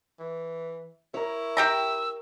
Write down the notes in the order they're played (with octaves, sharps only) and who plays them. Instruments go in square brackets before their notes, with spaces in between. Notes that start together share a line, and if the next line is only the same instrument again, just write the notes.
[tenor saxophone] E3
[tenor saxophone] E4 [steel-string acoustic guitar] A#4 C#5
[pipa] G4 G5 A#5 [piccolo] E6